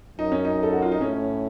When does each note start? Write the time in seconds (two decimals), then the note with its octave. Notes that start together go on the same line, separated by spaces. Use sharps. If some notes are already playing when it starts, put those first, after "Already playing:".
0.18 F#2 D#4
0.32 C#4
0.45 D#4
0.63 A4
0.73 F#4
0.82 F4
0.92 D#4
1.01 A2 C#4